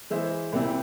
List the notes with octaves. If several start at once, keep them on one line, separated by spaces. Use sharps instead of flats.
E3 G#3 E4 G#4 C5
C2 A#2 G3 C4 E4